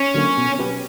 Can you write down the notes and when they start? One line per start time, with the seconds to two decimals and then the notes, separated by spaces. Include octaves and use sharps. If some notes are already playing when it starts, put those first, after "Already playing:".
Already playing: C#4
0.15 D3 F#3 A#3
0.38 B2
0.59 F#3 C#4 G4 B4